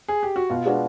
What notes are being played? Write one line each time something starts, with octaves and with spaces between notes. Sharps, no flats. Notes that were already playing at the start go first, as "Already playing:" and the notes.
G#4
G4
F#4
B2 F4
G#3 B3 D4 F#4